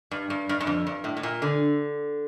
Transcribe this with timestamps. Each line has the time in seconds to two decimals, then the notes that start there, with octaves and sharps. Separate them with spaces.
0.11 G2
0.30 G2
0.49 G2
0.60 G2
0.67 F2
0.87 G2
1.04 A2
1.17 A2
1.23 A#2
1.42 D3